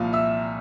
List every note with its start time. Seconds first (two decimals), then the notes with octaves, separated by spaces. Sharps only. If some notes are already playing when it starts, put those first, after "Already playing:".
Already playing: C2 A#2 F3 F5
0.13 E5 E6